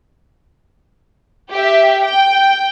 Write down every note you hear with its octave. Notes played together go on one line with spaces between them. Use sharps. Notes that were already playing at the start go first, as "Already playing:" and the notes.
G4 E5
G5